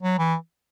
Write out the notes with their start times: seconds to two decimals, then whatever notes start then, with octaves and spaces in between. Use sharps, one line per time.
0.03 F#3
0.18 E3